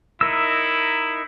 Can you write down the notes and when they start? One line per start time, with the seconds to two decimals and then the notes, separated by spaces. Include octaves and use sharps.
0.21 D#4 E4 A#4 E6